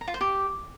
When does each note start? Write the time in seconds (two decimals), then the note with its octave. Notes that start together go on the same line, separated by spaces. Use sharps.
0.01 A#5
0.08 F4
0.14 C5
0.21 G4